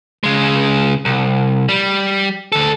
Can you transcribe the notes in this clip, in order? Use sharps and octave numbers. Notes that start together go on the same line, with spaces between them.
C#3 G#3
C2
G3
D2 A4